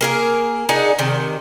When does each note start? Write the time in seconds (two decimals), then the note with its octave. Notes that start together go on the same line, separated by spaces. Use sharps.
0.01 A#3 G#4 A#4
0.69 D4 D#4 G#4 F#5
0.99 C3 D#3